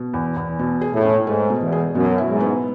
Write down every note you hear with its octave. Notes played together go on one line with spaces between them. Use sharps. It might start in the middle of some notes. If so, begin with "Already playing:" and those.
Already playing: B2
E2
E2
B2
G#4
A2
C#4
G#2 A3
B2
E2
G#4
F#2 B2
E4
G#2
B3